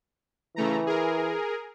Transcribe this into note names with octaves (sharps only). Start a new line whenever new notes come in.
C#3 E3 A3 A#5
G#4 A#4